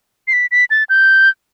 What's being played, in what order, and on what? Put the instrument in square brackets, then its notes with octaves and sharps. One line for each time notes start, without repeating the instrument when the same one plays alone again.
[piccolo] C7
B6
B6
A6
G6